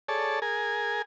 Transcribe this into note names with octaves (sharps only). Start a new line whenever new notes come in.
G#4 A4 C#5 D5 A5
G#4 A#4 G#5